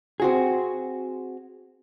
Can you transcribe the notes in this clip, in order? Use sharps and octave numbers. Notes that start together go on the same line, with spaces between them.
C4 F#4 G#4